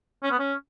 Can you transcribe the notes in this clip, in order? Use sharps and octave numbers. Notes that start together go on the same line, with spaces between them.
C#4
B3
C#4